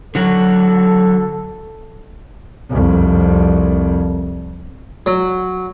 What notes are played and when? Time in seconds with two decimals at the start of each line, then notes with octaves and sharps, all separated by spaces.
0.15 D3 F#3 F#4 A4
2.70 C2 F2
5.06 F#3